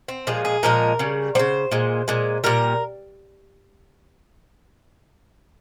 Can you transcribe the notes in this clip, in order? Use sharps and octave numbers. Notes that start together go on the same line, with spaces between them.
C4
A#2 F3 G#3 G#4
G#4
A#2 F3 G#3 A#4
C#3 G3
C#3 G3 C5
A#2 G#3
A#2 G#3
A#2 G3 A#4